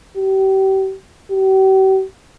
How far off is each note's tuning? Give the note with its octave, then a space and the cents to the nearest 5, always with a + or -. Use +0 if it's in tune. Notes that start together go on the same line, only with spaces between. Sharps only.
G4 -35
G4 -45